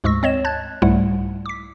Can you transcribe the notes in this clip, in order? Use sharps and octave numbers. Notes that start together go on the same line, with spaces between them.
D2 G#2 G#3 C#6 E6 A#6
C4 C#5 D#5 E7
A5 F#6 G#6 A6
C2 G#2 G3 A3 E4 F#5
D6 B6